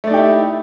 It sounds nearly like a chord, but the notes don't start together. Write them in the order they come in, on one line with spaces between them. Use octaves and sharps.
A3 D5 D#4 G4 E4